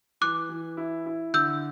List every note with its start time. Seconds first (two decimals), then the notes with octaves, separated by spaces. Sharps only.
0.21 E3 D6 F#6
0.49 E3
0.77 E4
1.06 E4
1.34 D3 E6 G6